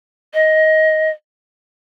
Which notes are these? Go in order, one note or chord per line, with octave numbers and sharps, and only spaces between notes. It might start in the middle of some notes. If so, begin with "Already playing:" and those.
D#5